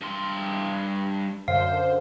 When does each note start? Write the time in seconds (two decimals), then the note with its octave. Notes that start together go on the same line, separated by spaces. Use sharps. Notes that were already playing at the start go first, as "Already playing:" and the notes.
0.01 G2 C6
1.48 F#2 D3 C5 F5